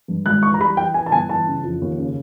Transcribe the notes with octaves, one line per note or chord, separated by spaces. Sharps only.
G2
G#1 F#6
E3 C#6
A#5
G3 B5
E3 G5
E3 G#5
A5
G1 G#5
E3 A5
C#3
F2
D#2
C#3